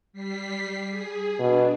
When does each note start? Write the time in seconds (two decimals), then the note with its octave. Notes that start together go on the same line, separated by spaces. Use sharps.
0.13 G3 B6 C7
0.90 G#4
1.39 B2 D4